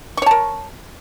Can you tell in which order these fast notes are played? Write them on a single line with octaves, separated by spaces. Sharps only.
C#6 C#5 A5 A#4